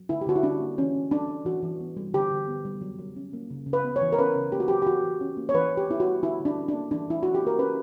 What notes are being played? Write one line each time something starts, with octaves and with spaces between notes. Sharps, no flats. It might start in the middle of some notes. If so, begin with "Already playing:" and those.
Already playing: F#3
D3 E4
G4
D3 F#4
E4
C#4 D4
A#3
E3 C#4
E3
C#4 D4
G3
E3 F#4
E3
B3
G3
D3 G4
D3
B3
G3
F#3
F#3
C#4
A#3
C#3
C#3
B4
B3
C#5
E3
A#4
C#4 B4
C#3
A#3 G4
F#4
F#3 G4
G4
E3 F#4
E3
C#4
A#3
C#5
E3 B4
E3
G4
B3 E4
F#4
G3
D3 E4
D3
D4
C#4
D4
A#3
E3 D4
E3 E4
C#4 F#4
G4
A#3 A#4
C#4 B4